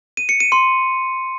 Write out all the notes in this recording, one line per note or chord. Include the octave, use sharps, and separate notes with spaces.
D#7
C#7
D#7
C6